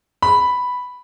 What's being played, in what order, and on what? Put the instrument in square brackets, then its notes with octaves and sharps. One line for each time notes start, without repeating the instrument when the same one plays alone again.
[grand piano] B5